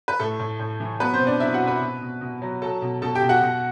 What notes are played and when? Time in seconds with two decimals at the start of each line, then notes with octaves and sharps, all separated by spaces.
0.08 B4
0.20 A2 A3 A4
0.40 A2
0.60 A2
0.80 E3
1.00 F#3 B3 B4
1.14 C4 C5
1.20 B2
1.27 D4 D5
1.40 F#3 E4 E5
1.54 F#4 F#5
1.61 B2
1.67 B4 B5
1.81 B2
2.01 B2
2.21 B2
2.42 F#3
2.62 F#3 A4 A5
2.82 B2
3.02 B2 A4 A5
3.15 G4 G5
3.22 B2
3.29 F#4 F#5
3.42 B2